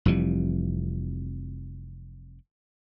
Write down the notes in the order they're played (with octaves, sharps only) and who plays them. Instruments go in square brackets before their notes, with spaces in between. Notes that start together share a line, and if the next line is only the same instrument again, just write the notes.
[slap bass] F1 F2 E3 G3